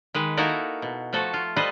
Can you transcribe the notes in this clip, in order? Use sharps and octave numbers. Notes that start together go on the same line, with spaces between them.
D#3 G#3 B4
A#3 D#4 E4 F#4 A4 A#4
B2
F3 A3 F#4 A4
F4
G3 A4 B4 C5 D#5